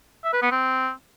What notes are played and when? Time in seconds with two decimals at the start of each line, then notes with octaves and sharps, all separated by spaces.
0.24 E5
0.33 B4
0.42 B3
0.51 C4